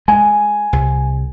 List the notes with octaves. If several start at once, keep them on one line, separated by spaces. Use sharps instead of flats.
G#3 G#5
C2